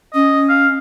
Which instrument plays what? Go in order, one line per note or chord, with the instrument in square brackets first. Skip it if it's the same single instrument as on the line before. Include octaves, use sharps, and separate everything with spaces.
[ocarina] C#4 [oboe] D#5
[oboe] F5